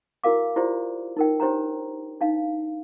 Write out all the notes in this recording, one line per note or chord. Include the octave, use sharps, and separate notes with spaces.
E4 F#4 A#4 F5 D6
E4 F4 G4 C5 D5
D#4 A#4 G5
D4 G4 C5 C#5 A#5
D4 D#4 F5